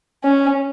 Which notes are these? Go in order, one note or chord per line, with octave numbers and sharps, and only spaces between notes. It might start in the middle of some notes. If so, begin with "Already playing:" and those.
C#4